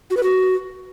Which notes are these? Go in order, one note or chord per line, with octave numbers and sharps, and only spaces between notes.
F#4
B4
F#4